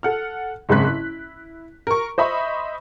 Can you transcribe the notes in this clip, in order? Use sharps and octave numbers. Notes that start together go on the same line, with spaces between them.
A4 F#5 F6
F#1 G#2 C4 B5 F#6 B6
E4
A#4 C#6
C5 D#5 E5 B5 C#6